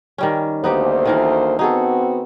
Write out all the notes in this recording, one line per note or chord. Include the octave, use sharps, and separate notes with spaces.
D#3 G3 C#4
D2 A#3 B3 D#4 G4 C5
D#3 E3 A#4
B3 C4 D#4 F#4 G#4 A4